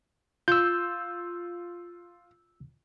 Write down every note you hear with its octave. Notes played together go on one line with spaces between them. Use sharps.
F4 E6 G6